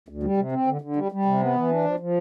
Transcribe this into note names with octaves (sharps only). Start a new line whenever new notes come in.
D2
G3
C3
C4
D3
D3
G3
G3
C3
B3
E3
D4
F3
F3